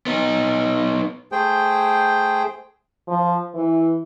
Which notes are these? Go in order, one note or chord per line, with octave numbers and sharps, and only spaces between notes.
B3 D#4
A3 G#4 C5 G5
F3
E3